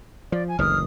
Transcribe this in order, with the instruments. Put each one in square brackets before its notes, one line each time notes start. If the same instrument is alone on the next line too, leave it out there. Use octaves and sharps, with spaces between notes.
[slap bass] F3 [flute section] D5
[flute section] G#5
[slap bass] F#1 D2 E3 [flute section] D#6 F6